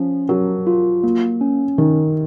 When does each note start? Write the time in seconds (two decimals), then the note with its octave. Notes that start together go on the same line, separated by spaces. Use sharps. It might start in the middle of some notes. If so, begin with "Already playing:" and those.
Already playing: F3 C#4
0.29 F#3 A#4
0.67 F4
1.04 A#3
1.41 C#4
1.78 D#3 A#4